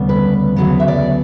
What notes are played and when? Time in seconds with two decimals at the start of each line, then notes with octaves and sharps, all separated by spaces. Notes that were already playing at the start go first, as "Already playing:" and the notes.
Already playing: D2 C#3 G3 B3
0.09 B4
0.56 D2 C#3 F#3 B3
0.80 E5
0.88 D5